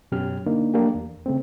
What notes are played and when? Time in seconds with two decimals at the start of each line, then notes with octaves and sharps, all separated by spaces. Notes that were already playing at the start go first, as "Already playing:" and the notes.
0.12 F#2 B2 F#3 C#4 G4 F6
0.46 D3 A#3 D4 D#4
0.74 F3 F#3 A3 A#3 D4 G4
0.95 E2
1.26 C#3 A3 C4